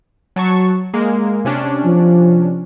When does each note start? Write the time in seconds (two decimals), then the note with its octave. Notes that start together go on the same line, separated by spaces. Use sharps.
0.36 F#3 A5 C#6
0.94 G#3 A#3
1.45 C3 C#4 D4
1.85 F3